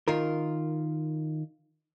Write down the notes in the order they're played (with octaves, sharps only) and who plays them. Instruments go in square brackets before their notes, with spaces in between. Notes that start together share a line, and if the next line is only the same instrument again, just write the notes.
[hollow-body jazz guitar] D#3 F4 A#4